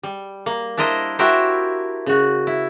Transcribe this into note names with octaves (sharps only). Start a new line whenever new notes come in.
G3
A#3
D4 E4 A#4 C5 D#5
E4 F#4 G4 A#4 C5 E5
C#3 F#4
E4